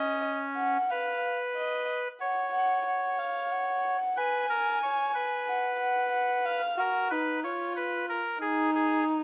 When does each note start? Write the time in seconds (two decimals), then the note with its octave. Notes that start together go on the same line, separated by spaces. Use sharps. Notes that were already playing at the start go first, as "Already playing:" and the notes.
Already playing: C#4 D#5
0.57 F#5
0.90 B4 F5
1.55 D#5
2.21 C#5 F#5
2.53 F#5
2.86 F#5
3.19 F5
3.51 F#5
4.17 B4 G#5
4.49 A#4
4.83 C#5
5.14 B4
5.47 F#5
5.80 F#5
6.12 F#5
6.45 F5
6.78 F#4 A#4
7.10 D#4 B4
7.44 F4 C#5
7.76 B4
8.09 A#4
8.41 D#4 G#4
8.75 G#4